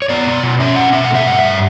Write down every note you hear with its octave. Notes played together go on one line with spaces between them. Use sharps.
C#5
B3 D5
B2
B2
C#4 E5
B2 F#5
B2 E5
F#5
A3
E5
G2 F#5
G2 E5